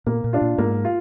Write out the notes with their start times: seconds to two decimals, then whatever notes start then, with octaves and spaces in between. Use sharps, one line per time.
0.06 A#2 A#3
0.24 A#2
0.33 D4 F4
0.41 A#2
0.58 G#2 A#3
0.85 F4